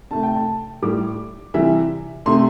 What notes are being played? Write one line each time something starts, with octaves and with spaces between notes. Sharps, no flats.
C3 A3 A5
G5
A5
A2 G3 D6
C3 E3 G3 E5
C3 A3 C6